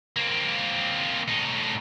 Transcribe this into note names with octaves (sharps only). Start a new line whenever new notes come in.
A#3 C4
A2 D#4